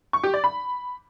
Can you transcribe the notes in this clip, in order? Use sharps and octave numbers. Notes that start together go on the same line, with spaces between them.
C#6
G4
D5
B5